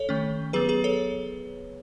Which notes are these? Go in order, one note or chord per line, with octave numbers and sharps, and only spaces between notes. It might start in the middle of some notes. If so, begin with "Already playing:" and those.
Already playing: A4 C#5
D#3 A3 C#4
F#3 B3 G#4 B4
G#4 B4
A4 C#5